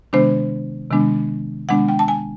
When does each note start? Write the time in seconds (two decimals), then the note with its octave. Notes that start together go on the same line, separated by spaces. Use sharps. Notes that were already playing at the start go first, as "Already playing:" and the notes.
0.13 C3 D#3 G#3 B3 D4 C5
0.91 C3 D#3 G#3 B3 D4
1.69 C3 D#3 G#3 B3 D4 F#5
1.88 G5
1.99 A5
2.08 G#5